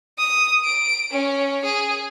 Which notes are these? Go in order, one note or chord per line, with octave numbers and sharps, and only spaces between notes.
D#6
D7
C#4
G#4